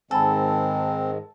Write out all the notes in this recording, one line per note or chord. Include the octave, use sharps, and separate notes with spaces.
G#2 D#3 G#3 C4 A4 G#5 A5 B5